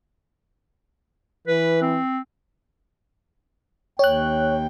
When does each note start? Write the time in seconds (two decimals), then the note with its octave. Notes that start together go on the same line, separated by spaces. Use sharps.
1.48 E3 B4
1.82 C4
3.99 D#2 C#5 G5 F#6